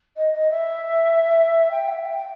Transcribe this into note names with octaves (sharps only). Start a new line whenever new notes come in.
D#5
D#5
E5
G5
E5
G5
G5